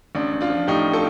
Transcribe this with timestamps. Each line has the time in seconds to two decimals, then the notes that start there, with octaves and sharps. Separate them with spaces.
0.15 A1 D4
0.33 A1
0.41 D4 F4
0.50 F3
0.67 A2 D#4 G4
0.93 F4 A4